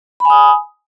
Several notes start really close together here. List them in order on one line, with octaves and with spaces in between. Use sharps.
B5 G#5 D#6